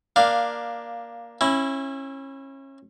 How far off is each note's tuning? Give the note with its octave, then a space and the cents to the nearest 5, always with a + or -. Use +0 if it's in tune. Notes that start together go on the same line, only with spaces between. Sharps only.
A#3 +10 D4 +10 F5 +0
C#4 -30 E4 +0